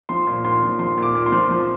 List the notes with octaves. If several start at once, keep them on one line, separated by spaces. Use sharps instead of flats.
F3 C6
A#2
A#2 C6
F3
F3 C6
A#2
D6
A#2
C6
F3
F3